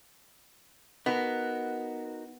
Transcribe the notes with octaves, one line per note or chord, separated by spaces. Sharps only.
B3 D#4 F#4 A#4